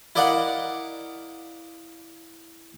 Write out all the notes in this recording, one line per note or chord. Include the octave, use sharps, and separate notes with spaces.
E4 A#4 D5 D#5 F5 F#5